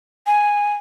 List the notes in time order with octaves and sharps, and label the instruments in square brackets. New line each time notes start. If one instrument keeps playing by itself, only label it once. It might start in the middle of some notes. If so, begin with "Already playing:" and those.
[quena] G#5